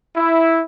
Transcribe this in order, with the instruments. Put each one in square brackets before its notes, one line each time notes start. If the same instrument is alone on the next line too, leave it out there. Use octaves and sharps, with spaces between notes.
[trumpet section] E4